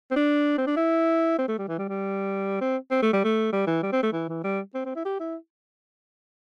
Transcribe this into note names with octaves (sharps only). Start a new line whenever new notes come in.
C4
D4
C4
D4
E4
C4
A3
G3
E3
G3
G3
C4
C4
A3
G3
A3
G3
E3
G3
C4
A3
E3
E3
G3
C4
C4
E4
G4
E4